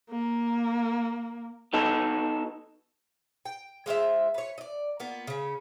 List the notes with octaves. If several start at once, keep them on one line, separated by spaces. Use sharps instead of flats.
A#3
B3 D#4 F#4 A4
G5
G#3 F4 C5 E5
B4 C#5
D5 D#5
A#3 B3 F4
C#3 C#4